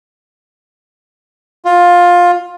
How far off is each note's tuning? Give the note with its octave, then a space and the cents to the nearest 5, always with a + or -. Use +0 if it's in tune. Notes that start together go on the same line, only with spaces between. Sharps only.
F4 +15